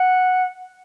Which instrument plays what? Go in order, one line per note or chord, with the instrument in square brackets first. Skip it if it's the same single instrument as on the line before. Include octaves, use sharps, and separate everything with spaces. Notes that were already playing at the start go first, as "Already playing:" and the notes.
Already playing: [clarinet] F#5